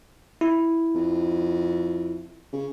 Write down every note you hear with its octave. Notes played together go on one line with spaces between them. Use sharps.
E4
F2
C#3